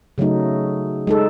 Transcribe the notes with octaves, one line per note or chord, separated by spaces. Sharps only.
C#3 F#3 A3 D#4
G#3 D#4 A4